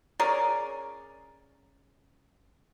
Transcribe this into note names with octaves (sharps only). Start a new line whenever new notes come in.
C#4 G#4 A#4 D5